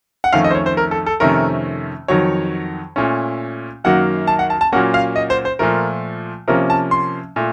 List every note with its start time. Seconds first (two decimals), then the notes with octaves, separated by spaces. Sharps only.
0.24 F#5
0.33 F2 D#3 A3 C#4 F5
0.44 D#5
0.50 C5
0.55 C#5
0.66 C5
0.77 A#4
0.91 A4
1.06 A4
1.20 F2 C3 D#3 A3 C#4 A#4
2.08 F2 D#3 F#3 C#5
2.96 A#2 A3 C#4
3.84 F#2 D#3 F#3 A#3 F#5
4.27 A5
4.39 F#5
4.50 A5
4.61 A5
4.72 A#2 F#3 A#3 C#4 F#5
4.94 F5
5.16 D#5
5.30 C5
5.45 C5
5.59 A#2 F3 A3 A#4
6.48 C3 F3 A#3 C#4 A#4
6.70 A5
6.91 C6
7.36 A#2 A3